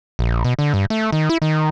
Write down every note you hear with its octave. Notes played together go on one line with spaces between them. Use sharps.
A#1
B2
D3
G2
A3
D#3
E4
D#3